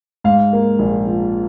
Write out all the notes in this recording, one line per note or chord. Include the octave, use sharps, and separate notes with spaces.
G#2 F5
A#3
A#1
F3